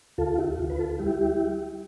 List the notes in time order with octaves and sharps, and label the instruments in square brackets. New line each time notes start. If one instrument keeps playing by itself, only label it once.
[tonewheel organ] D2 F4 A4
F4
E4 G4
D2 F4
B4
F4 A4
G3 E4 G4